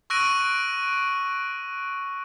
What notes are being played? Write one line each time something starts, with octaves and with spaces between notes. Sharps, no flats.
C#6 E6 F#6 A#6 D7 D#7